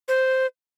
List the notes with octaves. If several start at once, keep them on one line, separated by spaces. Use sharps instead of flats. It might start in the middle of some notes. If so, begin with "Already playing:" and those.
C5